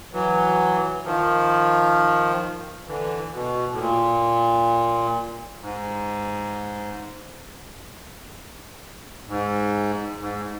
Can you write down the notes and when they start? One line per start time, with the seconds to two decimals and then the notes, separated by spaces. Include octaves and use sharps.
0.13 E3 F#3
1.05 D#3 F3
2.87 D3 E3
3.33 B2
3.72 A2
3.79 A#2
5.62 G#2
9.27 G#2
10.20 G#2